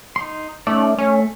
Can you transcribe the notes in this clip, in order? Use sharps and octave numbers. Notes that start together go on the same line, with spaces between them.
D#4 C6
A3 C#4 D#4 D5
A3 C#4